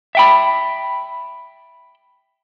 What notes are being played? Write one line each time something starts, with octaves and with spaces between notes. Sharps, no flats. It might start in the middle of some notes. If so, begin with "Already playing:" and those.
E5 G5 B5